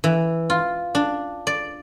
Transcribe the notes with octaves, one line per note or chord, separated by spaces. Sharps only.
E3
F4
D4
D5